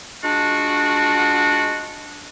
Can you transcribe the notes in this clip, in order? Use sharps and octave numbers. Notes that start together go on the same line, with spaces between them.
G#3 D4 F4 F#4